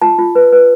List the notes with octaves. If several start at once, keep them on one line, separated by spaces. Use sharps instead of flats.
F4 A5
F4
B4
B4